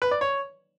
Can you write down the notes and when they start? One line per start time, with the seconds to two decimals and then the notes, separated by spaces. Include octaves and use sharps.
0.02 B4
0.11 D5
0.21 C#5